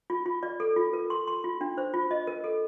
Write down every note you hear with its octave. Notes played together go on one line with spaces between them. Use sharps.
F4
F4
D5
A4
F4
A#4
C6
C6
F4
D4
C5
F4
D#5
A#4
A4